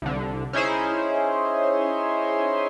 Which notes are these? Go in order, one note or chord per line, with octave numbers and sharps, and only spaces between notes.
C2 D3
C#4 D#4 E4 G#4 C5